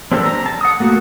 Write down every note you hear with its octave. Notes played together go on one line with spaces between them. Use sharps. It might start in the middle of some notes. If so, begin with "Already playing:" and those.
C4 D4 G4 A4 A#4
A#5
A5
F#5 D#6
A3 A#3 F#4